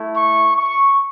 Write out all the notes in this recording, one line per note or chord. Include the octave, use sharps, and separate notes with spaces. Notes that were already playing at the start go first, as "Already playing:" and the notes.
Already playing: A3 E4
C#6
C#6